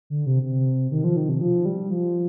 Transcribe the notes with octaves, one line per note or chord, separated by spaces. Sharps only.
D3
C3
C3
D#3
F3
D#3
C3
F3
G3
F3